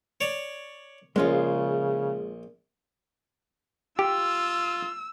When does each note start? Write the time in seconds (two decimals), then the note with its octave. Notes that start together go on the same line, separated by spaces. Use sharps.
0.21 C#5 D5
1.16 A#1 C#3 G#3 C#4 F4
3.99 F4 G4 E6